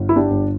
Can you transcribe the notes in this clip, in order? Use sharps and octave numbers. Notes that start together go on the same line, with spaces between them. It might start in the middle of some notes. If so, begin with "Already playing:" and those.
Already playing: G1
E4
D4 G4
G1